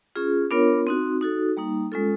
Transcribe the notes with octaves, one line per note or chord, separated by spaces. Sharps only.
C#4 F4 G#4
B3 D4 F4 A#4 C#5
C4 D#4 F#4
D#4 F#4 A4
G3 A#3 D#4
G#3 C#4 F4 A4